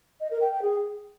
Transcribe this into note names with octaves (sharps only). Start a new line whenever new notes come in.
D#5
A#4
G5
G5
G#4